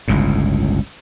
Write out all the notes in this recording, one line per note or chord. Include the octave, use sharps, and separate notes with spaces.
G1 C#2 A2